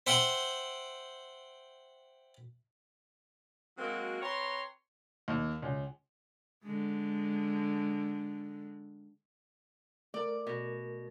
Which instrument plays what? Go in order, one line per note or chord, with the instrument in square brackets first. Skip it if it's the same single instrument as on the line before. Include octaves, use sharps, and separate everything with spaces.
[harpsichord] C5 E5 F#5 G5 C6
[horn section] F#3 G#3 A#3 C4 F#4
C4 B4 C#5 A#5 C6
[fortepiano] D#2
C#2
[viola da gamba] D3 G#3
[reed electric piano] A3 A#4 [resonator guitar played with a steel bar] D5
[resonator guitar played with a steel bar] B2